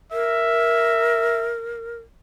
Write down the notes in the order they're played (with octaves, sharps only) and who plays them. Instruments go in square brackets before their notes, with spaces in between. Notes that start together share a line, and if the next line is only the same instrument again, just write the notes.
[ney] A#4 [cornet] E5